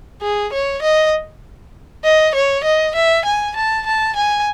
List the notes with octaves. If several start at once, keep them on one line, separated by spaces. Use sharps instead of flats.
G#4
C#5
D#5
D#5
C#5
D#5
E5
G#5
A5
A5
G#5